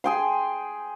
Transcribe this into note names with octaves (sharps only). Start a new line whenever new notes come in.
G#4 G5 C6